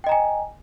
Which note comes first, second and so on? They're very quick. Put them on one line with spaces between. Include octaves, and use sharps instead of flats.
G5 D#5 A#5 G#5